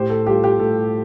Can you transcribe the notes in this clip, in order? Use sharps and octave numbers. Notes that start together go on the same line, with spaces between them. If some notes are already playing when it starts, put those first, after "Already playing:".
Already playing: A2 G4 C5
A4
G3 F4 G4
G4
A2 A4